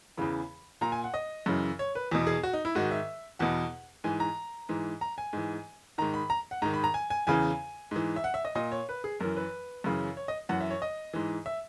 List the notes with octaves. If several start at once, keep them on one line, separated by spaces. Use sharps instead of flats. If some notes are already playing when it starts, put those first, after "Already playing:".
E2 C#3 E3 B5
A#2 A#5
G#5
F#5
D#5
F#2 C#3 E3
C#5
B4
E2 B2
G#4
F#4
D#4
E4
G#2 D#3 F#4
E5
E2 B2 F#5
G#2 E3 G#5
A#5
G#2 E3
A#5
G#5
G#2 E3
G#2 D#3 A#5
B5
A#5
F#5
G#2 D#3 A#5
B5
A#5
G#5
G#5
E2 C#3 E3 G#5
G#2 E3
E5
F#5
E5
D#5
A#2 D#5
C#5
B4
G#4
F#2 E3 A#4
B4
F#2 C#3 E3
C#5
D#5
F#2 E3 F#5
E5
C#5
D#5
G#2 E3
E5